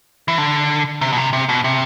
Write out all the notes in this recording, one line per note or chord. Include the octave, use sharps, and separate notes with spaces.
E3
D3
C3
B2
C3
C3
B2
C3